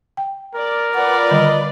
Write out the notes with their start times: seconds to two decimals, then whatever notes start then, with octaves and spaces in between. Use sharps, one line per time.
0.17 G5
0.55 A#4 D5
0.95 F4 B4 D5 F#5
1.31 D3 D#3 G3 D#5